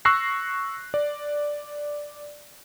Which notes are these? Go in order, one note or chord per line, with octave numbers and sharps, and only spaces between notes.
C#6 E6 F#6 A#6 C7
D5